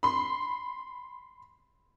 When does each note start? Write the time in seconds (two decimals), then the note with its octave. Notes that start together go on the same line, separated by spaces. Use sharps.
0.03 B5 C6